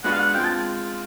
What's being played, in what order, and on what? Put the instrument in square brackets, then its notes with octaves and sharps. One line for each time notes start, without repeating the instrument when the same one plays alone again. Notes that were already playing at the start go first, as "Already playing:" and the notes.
[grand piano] G#3 B3 D4 F#4 B4 [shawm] F#5
[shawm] F5
F#5
[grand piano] G#3 C4 F4 [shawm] G5
[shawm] A5